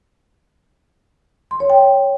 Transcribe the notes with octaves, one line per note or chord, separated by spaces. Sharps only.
C6
C#5
G5